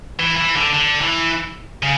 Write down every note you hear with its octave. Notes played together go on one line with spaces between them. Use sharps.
E3
E3
D3
D3
E3
C#3